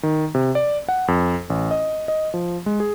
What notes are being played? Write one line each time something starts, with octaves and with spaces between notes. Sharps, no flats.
D#3
C3
D5
F#5
F2
A1
D#5
D#5
F3
G#3
G#4